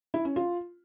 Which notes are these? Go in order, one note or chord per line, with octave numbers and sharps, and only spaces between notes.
E4
C#4
F4